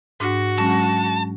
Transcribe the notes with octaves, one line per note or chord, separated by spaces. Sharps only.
G#2 D4 F#4
F#3 G#3 C#4 A5